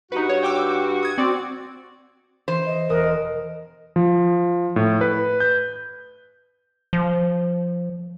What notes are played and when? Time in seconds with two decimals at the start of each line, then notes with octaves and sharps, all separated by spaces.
0.12 G2 D#4 F#4 B4
0.29 C#5
0.43 G5 D6 E6
1.03 D#6 G#6
1.18 C4 F#4 D5
2.48 E3 C5
2.67 D#5
2.90 E1 A#4 D#6 F#6
3.96 F3
4.76 A2
5.01 B4
5.40 G6
6.93 F3